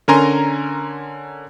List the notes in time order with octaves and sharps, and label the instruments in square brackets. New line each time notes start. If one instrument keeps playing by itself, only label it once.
[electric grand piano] D3 C#4 A#4 G#5 A#5 C6